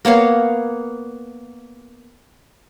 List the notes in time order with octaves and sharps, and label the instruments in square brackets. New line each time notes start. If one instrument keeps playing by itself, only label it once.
[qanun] A#3 B3 C#5 F5